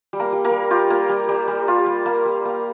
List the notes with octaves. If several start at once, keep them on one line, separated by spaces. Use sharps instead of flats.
G3
A#3 A#4
G3
A#3 A#4
G3
F4 G4
A#3
G3
G3
G3
F4
G3
A#3
G3
A#3